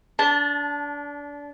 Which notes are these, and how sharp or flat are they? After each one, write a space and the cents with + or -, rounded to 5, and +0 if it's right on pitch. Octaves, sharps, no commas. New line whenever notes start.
D4 -25 A5 +0